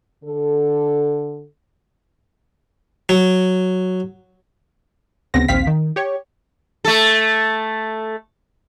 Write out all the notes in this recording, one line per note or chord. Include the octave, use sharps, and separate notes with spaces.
D3 A4
F#3
D2 C#3 B3 C4 A#6
A#1 D#2 C4 F5 B6
D#3
G4 C#5
A3 A4